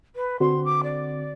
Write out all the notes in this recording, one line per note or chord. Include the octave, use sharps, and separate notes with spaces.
B4
D3 C4 F#4 C6
D6
D5